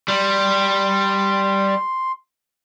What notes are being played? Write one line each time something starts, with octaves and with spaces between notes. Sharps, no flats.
G3 C6